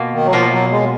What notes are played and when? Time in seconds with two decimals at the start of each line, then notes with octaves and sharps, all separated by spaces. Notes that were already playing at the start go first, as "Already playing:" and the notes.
Already playing: B2 A#3 F4
0.14 D#3
0.26 F#3
0.33 B2 F3 A#3 F4
0.52 F#3
0.71 G#3